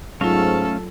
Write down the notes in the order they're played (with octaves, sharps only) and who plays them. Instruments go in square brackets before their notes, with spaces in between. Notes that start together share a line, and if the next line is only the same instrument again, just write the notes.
[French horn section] G#2 [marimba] F#3 F4 [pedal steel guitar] A3 C#4 F5 [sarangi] A4